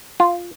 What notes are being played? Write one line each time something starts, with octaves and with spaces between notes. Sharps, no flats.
F4